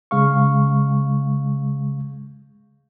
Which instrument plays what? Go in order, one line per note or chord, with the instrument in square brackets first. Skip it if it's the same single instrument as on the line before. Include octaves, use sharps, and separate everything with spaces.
[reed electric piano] C#3 G#3 F5 C#6